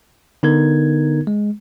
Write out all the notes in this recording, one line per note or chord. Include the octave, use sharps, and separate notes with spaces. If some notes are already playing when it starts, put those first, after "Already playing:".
D3 B3 D#4 A#4 G#6
G#3